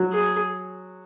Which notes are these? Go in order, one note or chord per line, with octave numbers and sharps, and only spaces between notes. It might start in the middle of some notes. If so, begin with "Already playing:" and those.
Already playing: F#3
G#4